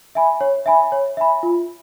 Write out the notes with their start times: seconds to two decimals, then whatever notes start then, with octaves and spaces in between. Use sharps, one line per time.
0.15 E5 G#5 B5
0.41 C#5
0.66 E5 G#5 B5
0.92 C#5
1.17 E5 G#5 B5
1.43 F4